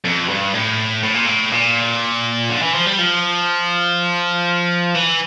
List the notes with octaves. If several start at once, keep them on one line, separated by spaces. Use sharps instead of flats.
F2
G2
A2
A2
A#2
A2
A#2
D3
E3
F3
G3
F3
E3